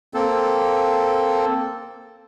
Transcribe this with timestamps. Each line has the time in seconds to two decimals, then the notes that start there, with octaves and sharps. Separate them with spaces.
0.14 A#3 C4 A4